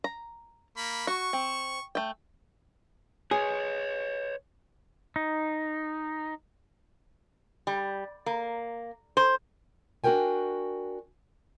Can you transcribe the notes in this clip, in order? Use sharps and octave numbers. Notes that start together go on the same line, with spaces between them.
A#5
A#3 B5
F#4 C#6
C4
A3 G5
G#4 B4 C#5
D#4
G3
A#3
C5
D4 F#4 G4 A#4 G5 G#5